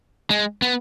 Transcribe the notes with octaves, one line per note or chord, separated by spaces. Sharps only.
G#3
B3